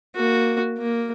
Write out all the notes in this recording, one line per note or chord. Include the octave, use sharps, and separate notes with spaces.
A#3 F#4
A#3